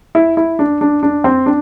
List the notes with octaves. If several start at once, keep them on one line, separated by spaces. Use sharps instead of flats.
E4
E4
D4
D4
D4
C4
D4